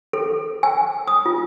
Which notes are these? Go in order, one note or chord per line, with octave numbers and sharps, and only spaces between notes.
A4
G#5
D#6
F4